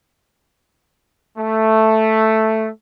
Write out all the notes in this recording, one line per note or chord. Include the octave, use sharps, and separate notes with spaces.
A3